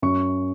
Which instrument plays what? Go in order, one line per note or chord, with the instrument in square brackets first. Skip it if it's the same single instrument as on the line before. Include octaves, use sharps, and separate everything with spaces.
[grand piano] F#2 C#6